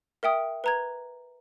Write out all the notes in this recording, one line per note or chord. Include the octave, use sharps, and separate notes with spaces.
A#4 E5 G5 D#6
B4 A#5 G#6